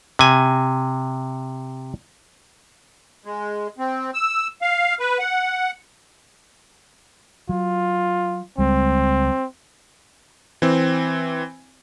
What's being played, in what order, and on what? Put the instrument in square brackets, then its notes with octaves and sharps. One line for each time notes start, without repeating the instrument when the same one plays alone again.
[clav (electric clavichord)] C3 G#5
[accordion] G#3
C4
E6
F5
B4
F#5
[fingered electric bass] F#3 [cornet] F4
[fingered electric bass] C#2 G3 G#3 [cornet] C4
[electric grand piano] E3 C4